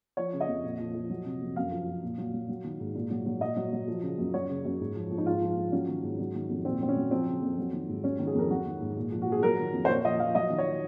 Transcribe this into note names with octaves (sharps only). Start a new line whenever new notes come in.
F3 C#5
C#3
D#5
F2
A#2
F3
F3
F#3
C3
F2
F#2 F5
F3
F3
A#2
F#3
F#3
F#3
D#3
G#2
A#2
F#3
F#3
A#2 D#5
F#3
F#3
F3
C#3
F#2
F#3 C#5
C#3
F#2
G#2
F3
F3
D#4
G#2 F4
F3
F3
F#3 C#4
D#3
G#2
F#3
D#3
F2
A#2 C4
F#3 C4
C#4
F#3
F3 C4
C#3
F2
F#3
D#3
G#2
F#3 C#4
D#3
G#4
F2 A#4
F#3 F#4
D#3
G#2
A#2
F3
F#4
F3 G#4
F#3 A#4
D#3
F2
C5
A#2 C#5
F3 D#5
F3 F5
F#3 D#5
D#3
C#5